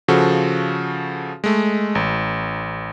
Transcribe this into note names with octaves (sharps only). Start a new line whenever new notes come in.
C#3 F3 F#4 A4
G#3 A3
A1